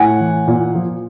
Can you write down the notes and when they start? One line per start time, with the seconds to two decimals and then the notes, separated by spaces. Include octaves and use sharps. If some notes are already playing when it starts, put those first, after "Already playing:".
Already playing: A2 F#5 G#5
0.20 E3
0.47 A#2
0.75 F3